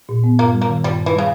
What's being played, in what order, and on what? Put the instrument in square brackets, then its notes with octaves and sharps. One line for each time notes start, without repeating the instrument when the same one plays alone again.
[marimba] A#2
B3
[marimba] G2 [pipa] A#3
[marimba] G3
[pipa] A#3
[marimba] D#3
[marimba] G2 [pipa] G3
[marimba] G2
[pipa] E3
[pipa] C#3 [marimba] G3